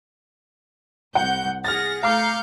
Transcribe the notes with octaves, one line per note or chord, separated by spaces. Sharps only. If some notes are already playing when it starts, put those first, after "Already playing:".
C2 F#5 G6
G#4 F#5 F6 A6 A#6
A3 F5 A#5 D6 G6 C#7